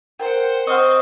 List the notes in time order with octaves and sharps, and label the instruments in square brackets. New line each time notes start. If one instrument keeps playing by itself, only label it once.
[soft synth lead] A#4 [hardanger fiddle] C5 F#5 [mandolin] G5
[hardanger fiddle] C4 [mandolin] D#5 F#5 [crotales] C#6 F6